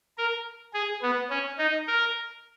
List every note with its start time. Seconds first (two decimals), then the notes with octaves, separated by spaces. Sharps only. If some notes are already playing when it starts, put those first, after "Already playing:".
0.18 A#4
0.74 G#4
1.02 B3
1.30 C#4
1.58 D#4
1.87 A#4